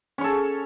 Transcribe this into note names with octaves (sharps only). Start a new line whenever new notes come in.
C#4 A4 C#5